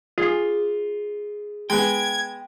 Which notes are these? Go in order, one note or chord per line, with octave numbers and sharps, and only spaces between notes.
F4 G#4
G#3 B3 G5 G#6